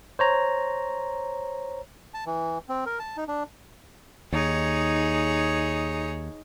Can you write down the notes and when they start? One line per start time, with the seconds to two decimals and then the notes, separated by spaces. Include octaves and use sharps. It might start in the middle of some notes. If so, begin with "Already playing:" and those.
0.19 C5 C#5 A#5
2.14 A5
2.26 E3
2.69 C4
2.86 A#4
2.99 A5
3.17 D#4
3.28 D4
4.33 D#2 D#4 G#4 C#5